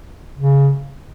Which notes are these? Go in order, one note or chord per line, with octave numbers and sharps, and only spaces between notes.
C#3